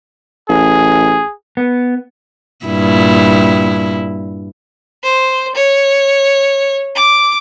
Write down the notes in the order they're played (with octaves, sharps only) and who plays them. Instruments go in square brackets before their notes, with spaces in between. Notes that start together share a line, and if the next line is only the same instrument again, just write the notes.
[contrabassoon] A1 [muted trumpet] G#4
[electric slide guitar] B3
[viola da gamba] G2 A#2 E4
[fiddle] C5
C#5
D6